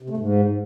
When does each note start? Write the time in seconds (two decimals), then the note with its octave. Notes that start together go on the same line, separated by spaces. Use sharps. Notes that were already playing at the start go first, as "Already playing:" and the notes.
0.02 C3
0.10 A3
0.17 G#2